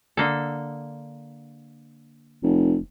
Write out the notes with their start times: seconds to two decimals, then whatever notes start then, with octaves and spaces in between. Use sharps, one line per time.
0.17 D3 A#3 A4
2.43 F1